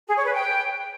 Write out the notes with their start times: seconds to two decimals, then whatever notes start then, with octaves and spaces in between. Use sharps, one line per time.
0.08 G#4
0.16 C#5
0.24 B4
0.32 G5